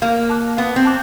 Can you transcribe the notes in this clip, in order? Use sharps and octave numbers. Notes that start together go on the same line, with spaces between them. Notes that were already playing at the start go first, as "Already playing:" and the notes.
A#3 F5
A5 D6 F#6
B3 F5
C4
A5 D6 F#6